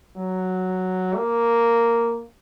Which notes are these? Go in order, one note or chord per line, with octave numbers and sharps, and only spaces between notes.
F#3
A#3